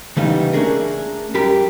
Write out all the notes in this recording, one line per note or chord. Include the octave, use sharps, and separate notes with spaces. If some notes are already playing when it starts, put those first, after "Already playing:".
C#3 E3 G3 A3 B3 D#4
A3 C#4 D4 G#4 A#4
F#2 G3 G4 A#4 B5